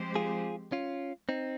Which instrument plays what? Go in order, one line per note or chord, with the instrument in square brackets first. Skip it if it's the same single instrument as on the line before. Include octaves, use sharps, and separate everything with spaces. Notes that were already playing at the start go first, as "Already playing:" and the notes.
Already playing: [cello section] F3 G#3 C4 G4 C5
[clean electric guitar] F4 G#4
C#4 F4
C4 D#4